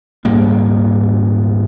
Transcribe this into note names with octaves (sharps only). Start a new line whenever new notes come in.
D#1 G#2 G3 A#3